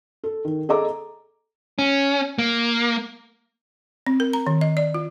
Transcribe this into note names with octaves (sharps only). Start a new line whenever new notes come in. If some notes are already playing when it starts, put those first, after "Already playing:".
A4
D#3
G#4 A4 D#5 A#5 D6
C#4
A#3
C4
A#4
A#5
D#3
D#5
D5
F4